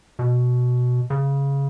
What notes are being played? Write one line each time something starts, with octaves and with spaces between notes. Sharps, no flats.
B2
C#3